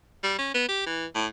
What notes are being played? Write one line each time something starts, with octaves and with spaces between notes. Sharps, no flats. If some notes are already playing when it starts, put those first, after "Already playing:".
G3
C#4
B3
G4
E3
A2